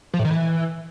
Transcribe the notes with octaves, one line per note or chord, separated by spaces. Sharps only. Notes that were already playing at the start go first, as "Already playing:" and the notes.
F3
A2
D#3
E3